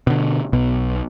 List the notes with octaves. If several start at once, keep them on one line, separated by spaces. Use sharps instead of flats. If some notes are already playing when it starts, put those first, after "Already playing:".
B2 D3
B1 B2